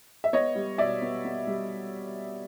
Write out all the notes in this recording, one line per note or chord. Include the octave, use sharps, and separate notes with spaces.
E5
B3 C#5 D#5
G3
B2 D5 E5
B3
B3
G3